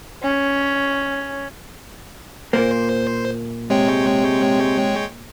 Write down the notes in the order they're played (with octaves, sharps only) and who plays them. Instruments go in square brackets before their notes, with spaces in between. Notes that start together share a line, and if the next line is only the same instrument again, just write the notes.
[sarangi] C#4
[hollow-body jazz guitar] A#2 A#3 [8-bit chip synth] C5
[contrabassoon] C3 [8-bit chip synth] G#3 C#5 G5